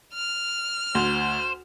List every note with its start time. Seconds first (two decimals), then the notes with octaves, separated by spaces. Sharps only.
0.13 F6
0.95 D2 C5